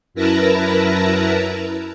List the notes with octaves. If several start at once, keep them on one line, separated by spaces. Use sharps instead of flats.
F#2 E4 A#4 B4 A5 A#5